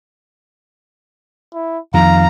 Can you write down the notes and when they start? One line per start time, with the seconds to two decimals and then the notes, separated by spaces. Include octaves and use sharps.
1.54 E4
1.94 F2 D#3 F5 A#5